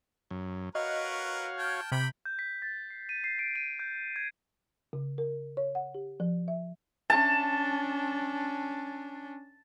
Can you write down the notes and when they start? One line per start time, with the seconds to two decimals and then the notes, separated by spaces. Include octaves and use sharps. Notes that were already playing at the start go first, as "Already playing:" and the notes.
0.31 F#2
0.75 F#4 A#4 B4 C#5 D#5 F5
1.57 G5 A5 F6 G#6
1.92 C3 G5 B5
2.25 G6
2.39 B6
2.62 A6
2.90 C7
3.09 D#7
3.24 C7
3.39 D7
3.56 D#7
3.79 G6
4.16 G#6
4.93 C#3
5.18 A#4
5.57 C#5
5.75 F#5
5.95 G4
6.20 F3
6.48 E5
7.10 C#4 D4 A5